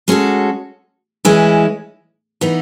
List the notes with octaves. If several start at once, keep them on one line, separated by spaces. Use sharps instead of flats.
G#3 C#4 F#4 A4
E3 G#3 C#4 E4
E3 B3 D#4